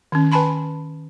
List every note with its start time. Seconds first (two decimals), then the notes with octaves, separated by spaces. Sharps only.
0.12 D#3 C#4
0.32 B4 G#5 A5 B5 C6